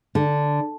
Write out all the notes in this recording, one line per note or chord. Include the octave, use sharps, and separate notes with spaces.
D3